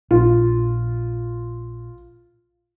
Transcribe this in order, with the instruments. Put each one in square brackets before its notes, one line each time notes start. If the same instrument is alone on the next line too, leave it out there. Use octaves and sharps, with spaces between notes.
[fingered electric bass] A#1 [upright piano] F4